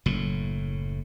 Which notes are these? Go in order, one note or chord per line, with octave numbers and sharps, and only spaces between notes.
F#1 A2